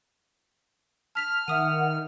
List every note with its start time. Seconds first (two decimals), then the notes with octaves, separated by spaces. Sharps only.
1.15 A5 F6 B6 F7
1.48 D#3 E5 F#5 D#6 D#7